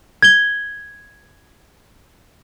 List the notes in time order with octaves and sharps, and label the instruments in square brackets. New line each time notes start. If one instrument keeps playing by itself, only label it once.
[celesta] G#6 G7